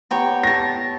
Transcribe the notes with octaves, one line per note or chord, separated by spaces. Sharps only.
B3 G4 C#5 G5 A#5
C#5 A5 A#6